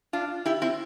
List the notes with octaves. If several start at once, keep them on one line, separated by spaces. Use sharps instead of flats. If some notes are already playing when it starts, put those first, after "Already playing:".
D4 F4
E4 G4
C4 E4